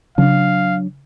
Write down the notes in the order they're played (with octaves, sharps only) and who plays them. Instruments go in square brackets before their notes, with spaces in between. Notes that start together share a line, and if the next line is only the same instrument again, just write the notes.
[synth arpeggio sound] C#3 [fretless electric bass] F#3 D4 [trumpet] F5